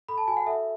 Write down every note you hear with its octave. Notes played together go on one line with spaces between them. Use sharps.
A4 B5
A5
F#4 G#5
F#5
A4 E5